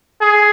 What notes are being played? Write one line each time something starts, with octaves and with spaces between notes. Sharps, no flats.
G#4